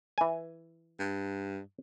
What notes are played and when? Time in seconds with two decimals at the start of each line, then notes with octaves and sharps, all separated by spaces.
0.18 E3 G#5
0.99 G2